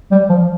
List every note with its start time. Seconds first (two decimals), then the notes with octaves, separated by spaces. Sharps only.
0.12 G3
0.29 F3